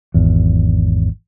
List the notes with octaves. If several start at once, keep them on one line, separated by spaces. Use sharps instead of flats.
G#1 E2